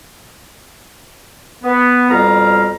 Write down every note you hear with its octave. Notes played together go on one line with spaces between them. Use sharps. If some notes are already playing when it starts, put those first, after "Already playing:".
B3
F2 B2 G3 F5 A#5